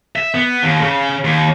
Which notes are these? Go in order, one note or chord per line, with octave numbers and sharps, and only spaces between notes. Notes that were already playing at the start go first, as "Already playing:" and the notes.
E5
B3
D#2
C#3
D#2